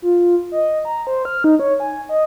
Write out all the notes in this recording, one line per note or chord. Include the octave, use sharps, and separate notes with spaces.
F4
D#5
A#5
C5
F6
D#4
C#5
G#5
D#5